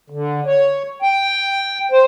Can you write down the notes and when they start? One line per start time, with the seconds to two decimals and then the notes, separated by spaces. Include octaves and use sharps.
0.10 D3
0.46 C#5
1.02 G5
1.92 C5